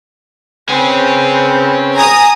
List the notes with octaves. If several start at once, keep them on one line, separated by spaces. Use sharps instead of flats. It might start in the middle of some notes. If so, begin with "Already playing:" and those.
C4 C#4 G#4 B4
G#5 A#5 D#6